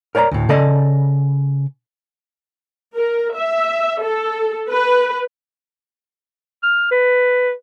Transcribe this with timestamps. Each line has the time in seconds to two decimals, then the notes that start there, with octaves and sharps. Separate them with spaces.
0.15 A#4 C#5 D5 G#5 A#5
0.31 D2 A2
0.49 C#3 A4 D5 D#5 A5
2.95 A#4
3.36 E5
4.01 A4
4.70 B4
6.63 F6
6.91 B4